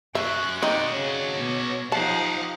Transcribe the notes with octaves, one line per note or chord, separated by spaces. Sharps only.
F#2 E5 C#6 F#6
C4 D#4 F#4 D5 D#5
C#3 C#5
B2
F3 D#4 G4 F5 F#5 A5